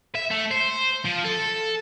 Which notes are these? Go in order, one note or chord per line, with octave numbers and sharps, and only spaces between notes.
E5
A3
C5
F3
A4